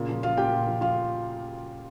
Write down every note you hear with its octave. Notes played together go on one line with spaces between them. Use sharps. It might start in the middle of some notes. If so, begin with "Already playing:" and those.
Already playing: A#2 C#3
F3
F3 F4 F5
A#2 G4 G5
A#2
F3
F3 F4 F5